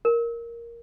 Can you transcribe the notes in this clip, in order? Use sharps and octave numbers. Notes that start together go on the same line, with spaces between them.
A#4